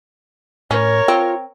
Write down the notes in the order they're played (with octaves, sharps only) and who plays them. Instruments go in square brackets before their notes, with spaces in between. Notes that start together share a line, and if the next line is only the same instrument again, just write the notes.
[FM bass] A2 [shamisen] C#4 [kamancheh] A#4 C#5
[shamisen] C4 [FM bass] F4